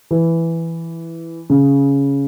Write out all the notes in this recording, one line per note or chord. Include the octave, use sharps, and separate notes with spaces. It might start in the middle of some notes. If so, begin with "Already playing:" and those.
E3
C#3